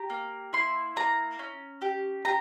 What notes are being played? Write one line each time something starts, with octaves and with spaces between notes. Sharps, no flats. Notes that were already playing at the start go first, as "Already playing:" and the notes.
Already playing: G4 A#5
A#3
E4 C6
A#3 A#5
C#4
G4
G4 A#5